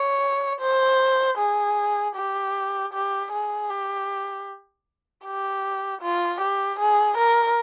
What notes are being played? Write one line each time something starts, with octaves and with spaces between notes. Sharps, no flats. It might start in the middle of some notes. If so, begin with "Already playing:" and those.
Already playing: C#5
C5
G#4
G4
G4
G#4
G4
G4
F4
G4
G#4
A#4